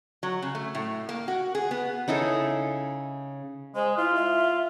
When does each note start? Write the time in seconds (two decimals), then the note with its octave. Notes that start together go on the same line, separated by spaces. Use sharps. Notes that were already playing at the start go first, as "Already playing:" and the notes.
0.23 F#3
0.42 C#3
0.55 A3
0.75 A2
1.09 A#3
1.28 F#4
1.55 G#4
1.71 B3
2.08 C#3 D#4 E4 A4
3.75 G#3 C5
3.98 E4 F4
4.15 E5